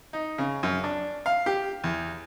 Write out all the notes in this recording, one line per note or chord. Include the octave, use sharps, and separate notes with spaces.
D#4
C#3
F#2
D4
F5
G4
E2